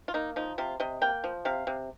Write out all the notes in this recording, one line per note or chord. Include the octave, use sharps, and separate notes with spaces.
F4
A#3 D#4
F3 D#4
C3 F4
C3 D#5
A#3 G5
F3
C3 F5
C3